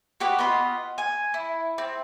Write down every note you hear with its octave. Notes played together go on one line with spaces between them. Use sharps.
F#4 G4 B4 D#5
B3 F4 D#5 B5
G#5
E4
C4